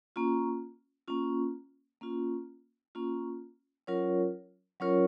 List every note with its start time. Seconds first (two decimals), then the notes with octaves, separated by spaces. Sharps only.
0.16 A#3 C#4 F4
1.08 A#3 C#4 F4
2.01 A#3 C#4 F4
2.95 A#3 C#4 F4
3.87 F#3 C#4 F4 A#4 C#5
4.80 F#3 C#4 F4 A#4 C#5